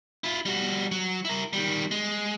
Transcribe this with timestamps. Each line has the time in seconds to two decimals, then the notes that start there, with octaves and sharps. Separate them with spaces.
0.24 E4 F4
0.45 G3 F#4
0.92 F#3
1.25 E4 A#4
1.53 D#3 G3
1.91 G#3